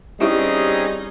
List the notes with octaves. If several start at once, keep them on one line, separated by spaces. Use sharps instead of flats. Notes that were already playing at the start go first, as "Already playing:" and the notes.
G3 C4 C#4 D#4 E4 G4 G#4 E5